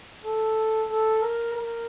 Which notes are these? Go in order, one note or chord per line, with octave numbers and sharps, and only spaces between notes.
A4
A4
A#4
A#4